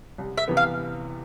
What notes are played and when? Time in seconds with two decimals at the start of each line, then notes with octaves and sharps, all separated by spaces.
0.18 C2
0.38 E5
0.48 C3 E3 B3
0.57 F5